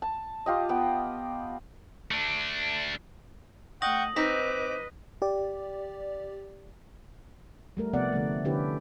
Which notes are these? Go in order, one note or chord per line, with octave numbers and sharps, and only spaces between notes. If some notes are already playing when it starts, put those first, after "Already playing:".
A5
F4 G4 D#5
B3 G5
A3 D4
A3 D#5 F#5 G5 C#6 D#6 A#6 F#7
C4 D#4 B4 D#5 D6 B6
G4 D5
G3 A3 A#4
C3 F3 B3 D5 F#5
D3 F3 A3
D3 C#4 D4 E4 G4 B4